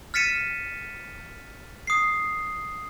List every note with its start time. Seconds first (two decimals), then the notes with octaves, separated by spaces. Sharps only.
0.14 F6 A6 B6 C#7 D#7 E7
1.87 D#6 C7